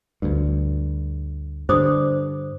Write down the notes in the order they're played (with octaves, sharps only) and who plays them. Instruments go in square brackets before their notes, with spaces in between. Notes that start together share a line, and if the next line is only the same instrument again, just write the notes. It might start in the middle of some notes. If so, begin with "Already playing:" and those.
[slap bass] D2 G2
[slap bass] G2 D3 [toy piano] C5 D6 D#6